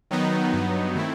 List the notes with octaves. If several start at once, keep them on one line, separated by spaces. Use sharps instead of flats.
D#3 F#3 B3 D#4
G2 F#3 B3 D#4
D#3 A3 C4 E4